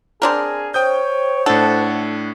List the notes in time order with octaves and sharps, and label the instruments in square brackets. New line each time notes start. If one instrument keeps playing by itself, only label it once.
[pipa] C4 D4 A#4 [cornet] G#4
[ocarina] C5 [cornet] C#5 [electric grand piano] G5 D#6 G6
[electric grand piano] A2 D4 [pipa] A4 [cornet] F#5